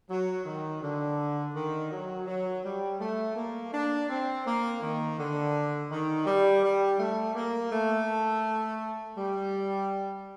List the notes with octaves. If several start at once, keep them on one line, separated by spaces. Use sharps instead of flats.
F#3
D#3
D3
D#3
F#3
F#3
G3
A3
A#3
D4
C4
A#3
D#3
D3
D#3
G3
G3
A3
A#3
A3
G3